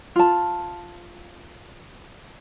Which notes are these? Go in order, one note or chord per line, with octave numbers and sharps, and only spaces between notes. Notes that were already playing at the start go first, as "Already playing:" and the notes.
F4 A5